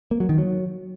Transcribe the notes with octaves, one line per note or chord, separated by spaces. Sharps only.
A#3
F#3
D#3
F#3